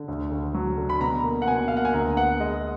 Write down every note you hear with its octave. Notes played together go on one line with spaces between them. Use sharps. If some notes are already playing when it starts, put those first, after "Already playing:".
Already playing: D3
D2
D2
F#3
D3
B5
B2 A#5
A#3
F#5
B2 G#5
A#3 F5
F#5
G#5
D2 A#5
B3 F#5
G#3 D#5